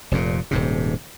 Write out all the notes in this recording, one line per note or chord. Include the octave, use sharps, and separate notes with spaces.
F1 F2 A#2
D#1 G#2 C3